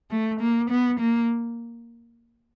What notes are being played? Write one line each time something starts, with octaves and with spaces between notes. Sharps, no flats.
A3
A#3
B3
A#3